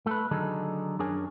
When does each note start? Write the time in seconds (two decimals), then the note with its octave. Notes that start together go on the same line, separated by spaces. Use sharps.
0.06 A3 A4 B4
0.31 D3 D#3 F#3 D#4 G#4 A4
0.99 F#2 D4 G#4 A#4 C#5 G#5